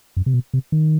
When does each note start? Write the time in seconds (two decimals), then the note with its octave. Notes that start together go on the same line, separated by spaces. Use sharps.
0.17 F#2
0.26 C3
0.34 B2
0.54 C3
0.72 D#3